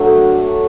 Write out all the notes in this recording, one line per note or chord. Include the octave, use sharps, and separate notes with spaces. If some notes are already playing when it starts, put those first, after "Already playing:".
Already playing: F#3 A3 D4